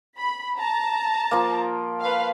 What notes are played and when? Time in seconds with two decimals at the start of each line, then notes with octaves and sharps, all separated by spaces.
0.19 B5
0.60 A5 A#5
1.31 F3 A#3
2.02 B4 F5